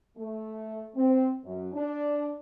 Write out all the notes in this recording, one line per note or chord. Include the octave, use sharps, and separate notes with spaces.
A3
C4
F#2
D4